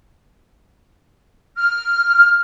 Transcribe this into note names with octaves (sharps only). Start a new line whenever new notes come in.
F6